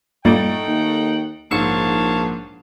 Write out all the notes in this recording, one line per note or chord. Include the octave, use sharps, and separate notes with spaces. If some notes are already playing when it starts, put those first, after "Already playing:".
G2 A#2 A3 D#4 F#5 G5 A6 D7
D#2
A#1 G#2 C#5 F5 A5 E6 C#7